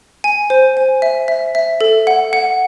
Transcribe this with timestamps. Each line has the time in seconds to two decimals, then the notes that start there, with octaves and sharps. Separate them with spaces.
0.24 G#5
0.50 C5
0.77 G#5
1.02 E5
1.28 E5
1.55 E5
1.81 A4
2.07 F#5
2.33 F#5